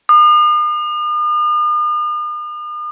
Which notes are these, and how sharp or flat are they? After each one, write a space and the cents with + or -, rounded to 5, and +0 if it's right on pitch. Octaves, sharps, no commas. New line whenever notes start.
D#6 -45